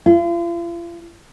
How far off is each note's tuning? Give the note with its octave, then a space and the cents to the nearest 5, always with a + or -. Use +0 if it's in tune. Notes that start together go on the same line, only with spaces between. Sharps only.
F4 -40